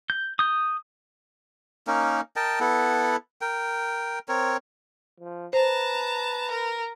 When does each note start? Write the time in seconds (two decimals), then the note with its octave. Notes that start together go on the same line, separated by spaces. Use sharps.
0.10 G6
0.39 D#6 G6
1.87 A#3 C#4 D#4 A#4
2.36 A#4 D#5 G5 A5
2.60 B3 E4 A4 F#5
3.41 A#4 G5
4.28 C4 A#4 C#5
5.20 F3
5.53 B4 C5 A5 A#5
6.51 A#4